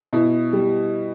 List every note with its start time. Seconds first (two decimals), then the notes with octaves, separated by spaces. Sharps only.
0.13 B2 E4
0.53 G3